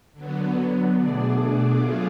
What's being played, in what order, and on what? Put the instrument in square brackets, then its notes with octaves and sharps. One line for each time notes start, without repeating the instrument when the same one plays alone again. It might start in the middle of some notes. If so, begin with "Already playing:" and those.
[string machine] D3 F#3 B3
B2 A3 D4 G#4 D5
F#3 A3 F4 G#4